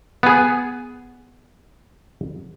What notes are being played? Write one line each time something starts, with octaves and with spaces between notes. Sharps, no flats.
B3 G#4